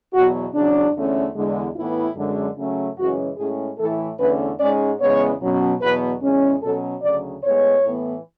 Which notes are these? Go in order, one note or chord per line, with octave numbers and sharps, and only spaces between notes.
E2 B2 F#3 F#4
E2 C#3 F#3 D4
E2 D3 A3 C#4
E2 D3 G#3
A2 E3 B3 E4
F#2 D3 G#3
C#3 F#3 A3 C#4
F#2 C#3 E3 G#3 C#4 F#4
A2 G#3 C#4 G#4
A2 E3 A3 A4
E2 D3 A3 C#4 B4
G#2 G#3 C#4 D5
E2 C#3 G#3 B3 C#5
B2 F#3 C#4
E2 B2 F#3 B3 B4
E2 C#3 G#3 C#4
B2 F#3 C#4 A4
D2 C#3 F#3 D5
A2 G#3 B3 C#5
A2 E3 B3